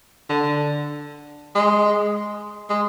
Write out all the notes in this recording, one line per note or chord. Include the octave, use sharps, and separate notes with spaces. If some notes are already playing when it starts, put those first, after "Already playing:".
D3
G#3
G#3